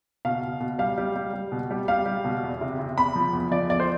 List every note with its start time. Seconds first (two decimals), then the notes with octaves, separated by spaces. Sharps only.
0.25 B2 F5
0.42 B2
0.60 B2
0.79 G3 F5
0.98 G3
1.16 G3
1.33 G3
1.52 B2
1.71 G3
1.88 G3 F5
2.06 G3
2.24 B2
2.43 E2
2.61 C3
2.79 C3
2.97 E2 B5
3.16 F3
3.33 E2
3.51 F3 D5
3.69 E2 D5
3.80 C5